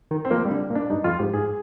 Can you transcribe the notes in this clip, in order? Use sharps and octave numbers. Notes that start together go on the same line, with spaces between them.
D#3
C4
F3 A#3
G3
D3
A#2
D4
G2 D#4
F2 F4
G#2 G4
G#2 G#4